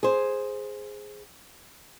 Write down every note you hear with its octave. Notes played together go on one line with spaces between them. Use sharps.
G#4 C5